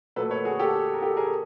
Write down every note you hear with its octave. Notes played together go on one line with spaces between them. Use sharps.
A#2 F#3 A3 A4 B4
B4 C#5
F#4 G#4
G4 A4
A#4
G4 A4
G#4 A#4